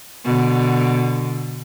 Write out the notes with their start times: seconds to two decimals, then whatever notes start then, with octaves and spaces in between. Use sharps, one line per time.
0.25 B2 D3